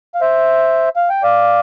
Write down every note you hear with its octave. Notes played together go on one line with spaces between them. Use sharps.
F5
C5 E5
F5
G5
D5 F5